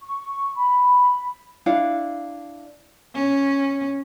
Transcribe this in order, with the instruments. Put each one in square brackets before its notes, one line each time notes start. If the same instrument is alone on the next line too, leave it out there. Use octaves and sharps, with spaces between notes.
[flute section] C#6
B5
[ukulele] D4 E4 F5 F#5
[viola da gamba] C#4